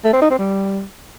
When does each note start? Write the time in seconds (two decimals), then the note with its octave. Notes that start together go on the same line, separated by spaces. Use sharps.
0.04 A3
0.13 C4
0.22 D#4
0.30 C4
0.39 G3